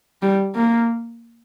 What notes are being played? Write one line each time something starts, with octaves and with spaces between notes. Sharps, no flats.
G3
A#3